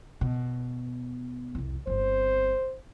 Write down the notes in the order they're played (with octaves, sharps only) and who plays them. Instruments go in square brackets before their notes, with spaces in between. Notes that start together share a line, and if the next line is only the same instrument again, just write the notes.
[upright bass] B2
C2 F2
[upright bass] G1 C4 [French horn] C5